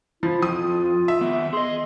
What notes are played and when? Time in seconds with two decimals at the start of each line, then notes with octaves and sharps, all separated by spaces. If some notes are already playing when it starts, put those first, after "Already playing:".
0.23 F3 E4
0.42 F2 F4 D#6
1.08 E5
1.21 D#3 B3
1.53 G#4 D#5 C6